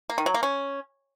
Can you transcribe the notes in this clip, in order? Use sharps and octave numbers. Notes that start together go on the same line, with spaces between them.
A#3
D#3
F#3
A#3
C#4